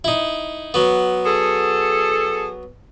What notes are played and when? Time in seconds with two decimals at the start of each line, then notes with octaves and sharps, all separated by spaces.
0.04 D#4 E4
0.74 F#3 B3
1.25 G#4 A4